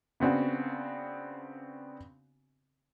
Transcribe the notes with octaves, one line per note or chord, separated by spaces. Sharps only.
C#3 B3 C4 D4 F#4